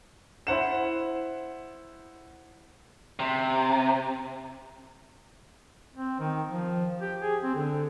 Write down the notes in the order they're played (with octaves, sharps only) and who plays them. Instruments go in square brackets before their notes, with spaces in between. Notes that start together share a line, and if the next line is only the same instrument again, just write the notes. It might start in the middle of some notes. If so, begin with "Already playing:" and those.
[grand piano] E4 C5 F#5 E7
[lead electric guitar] C3
[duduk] C4
D#3
F3
G4
G#4
C4
D3